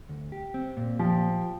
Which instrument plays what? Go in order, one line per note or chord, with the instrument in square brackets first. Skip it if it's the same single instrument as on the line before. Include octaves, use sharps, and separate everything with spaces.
[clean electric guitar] D2
G4
C4
A#2
[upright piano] F3 [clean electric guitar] G4